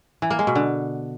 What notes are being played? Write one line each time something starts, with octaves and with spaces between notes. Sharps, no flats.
E3
A#3
G#3
B2
D3